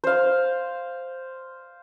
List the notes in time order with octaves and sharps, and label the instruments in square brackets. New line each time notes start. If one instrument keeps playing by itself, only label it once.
[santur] C5 F5